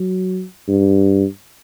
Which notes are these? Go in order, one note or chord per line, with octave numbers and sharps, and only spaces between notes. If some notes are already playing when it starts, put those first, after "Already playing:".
Already playing: F#3
G2